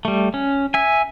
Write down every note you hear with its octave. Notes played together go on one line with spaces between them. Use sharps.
G3 A3
C#4
E5 G#5